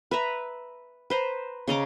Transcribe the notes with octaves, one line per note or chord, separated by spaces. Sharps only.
B4 E5 A#5
B4 C5 A#5
C#3 D#5 A#5 D6